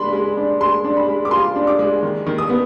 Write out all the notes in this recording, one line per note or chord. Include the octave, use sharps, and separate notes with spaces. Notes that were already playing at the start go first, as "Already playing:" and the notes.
Already playing: G#3 D4 B5 C6
G#3
D4
G#3 C6
D4
B5
G#3
D6
F4 C6
D4
D6
G#3
D#3
D#3
D#6
B3